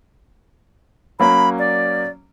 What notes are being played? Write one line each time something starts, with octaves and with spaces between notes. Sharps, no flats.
F#3 A#3 C#4 B5
D5